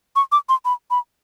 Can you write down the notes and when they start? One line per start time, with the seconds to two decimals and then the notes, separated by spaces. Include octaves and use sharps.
0.16 C#6
0.32 D6
0.49 C6
0.65 B5
0.91 B5